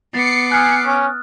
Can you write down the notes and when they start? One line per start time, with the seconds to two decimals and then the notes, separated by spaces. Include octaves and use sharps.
0.14 B3 D6 A6 C7 C#7
0.52 G#5 D#6 F6 F#6
0.85 C#4